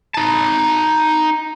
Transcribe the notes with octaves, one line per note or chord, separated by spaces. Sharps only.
D#4 A5